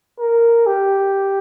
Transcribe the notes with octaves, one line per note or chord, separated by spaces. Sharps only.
A#4
G4